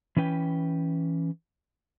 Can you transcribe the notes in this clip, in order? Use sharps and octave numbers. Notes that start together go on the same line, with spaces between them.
E3 C#4 B4 G5